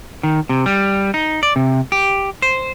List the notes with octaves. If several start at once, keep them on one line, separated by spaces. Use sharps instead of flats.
D#3
C3
G3
D#4
D5
C3
G4
C5